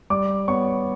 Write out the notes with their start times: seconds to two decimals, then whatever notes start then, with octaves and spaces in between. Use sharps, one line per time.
0.10 G3 D5 D6
0.48 B3 C#5 C#6